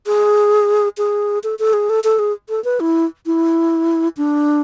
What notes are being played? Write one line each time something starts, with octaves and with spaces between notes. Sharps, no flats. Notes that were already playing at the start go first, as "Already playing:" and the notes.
G#4
G#4
A4
A4
G#4
A4
A4
G#4
A4
B4
E4
E4
D4